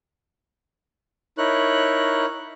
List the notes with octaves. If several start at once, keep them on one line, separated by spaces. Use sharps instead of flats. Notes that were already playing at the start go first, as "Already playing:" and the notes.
D#4 E4 A#4 C#5 F#6